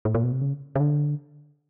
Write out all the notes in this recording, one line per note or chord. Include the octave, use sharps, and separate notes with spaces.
A2
A#2
B2
C3
C#3
C#3
D3